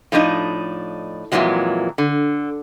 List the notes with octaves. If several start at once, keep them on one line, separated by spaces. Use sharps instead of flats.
A2 F3 D4 D#4 D#5
F2 A#2 C#3 E3 F#3 G#3
D3